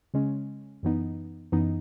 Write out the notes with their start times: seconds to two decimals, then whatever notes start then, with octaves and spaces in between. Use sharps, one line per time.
0.14 C#3 G#3 C#4
0.83 F#2 E3 B3 D#4
1.52 F#2 E3 B3 D#4